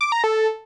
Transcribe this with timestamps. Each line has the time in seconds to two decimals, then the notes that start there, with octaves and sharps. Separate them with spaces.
0.01 D6
0.12 A#5
0.24 A4